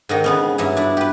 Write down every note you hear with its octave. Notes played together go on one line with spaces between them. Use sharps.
G#2 D3 D#3
C#3 B3 C#4
G2 F#3 E4
D4 E4
G4 B4